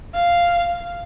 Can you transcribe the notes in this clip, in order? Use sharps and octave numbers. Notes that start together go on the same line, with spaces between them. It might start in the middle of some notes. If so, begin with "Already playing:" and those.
F5